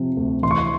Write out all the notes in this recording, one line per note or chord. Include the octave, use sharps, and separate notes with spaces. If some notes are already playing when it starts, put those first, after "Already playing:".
Already playing: C3 F3
D2
E3 C6
C#6
C6